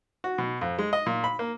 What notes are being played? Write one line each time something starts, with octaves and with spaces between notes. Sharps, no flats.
F#4
B2
F2
G#3
D#5
A#2
B5
A#3